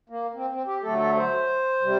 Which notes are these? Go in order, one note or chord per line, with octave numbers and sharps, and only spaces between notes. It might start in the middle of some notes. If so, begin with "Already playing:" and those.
A#3
C4
C4
G4
D3 F#3 A3 A4
A4
C5
C3 G3